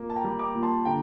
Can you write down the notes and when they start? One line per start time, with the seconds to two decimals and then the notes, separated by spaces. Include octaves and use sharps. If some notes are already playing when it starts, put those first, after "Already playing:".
Already playing: A#2 A#3
0.10 A5
0.16 G5 A#5
0.24 G3
0.39 A#5 D6
0.55 A#2
0.62 A5 C6
0.85 D3 G5 A#5